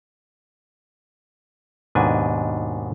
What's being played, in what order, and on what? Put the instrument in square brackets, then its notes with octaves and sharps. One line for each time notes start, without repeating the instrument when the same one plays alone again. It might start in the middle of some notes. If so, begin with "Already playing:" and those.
[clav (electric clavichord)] D#2 G#2 B2 D4 B4 G#5